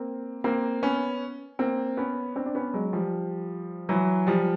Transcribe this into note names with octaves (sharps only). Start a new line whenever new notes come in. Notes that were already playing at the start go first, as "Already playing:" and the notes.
Already playing: A#3 C4
A#3 C4
B3 C#4
A#3 C4
B3 C#4
C4 D4
D4
B3 C#4
F#3 G#3
F3 G3
E3 F#3
F3 G3